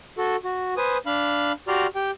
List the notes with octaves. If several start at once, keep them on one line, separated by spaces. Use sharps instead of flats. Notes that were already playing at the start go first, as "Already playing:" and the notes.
F#4 A4
F#4
B4 C5 G#5 D#6
D4 F5 B5
F#4 G4 D5 A#5 C6 F6
G4 G5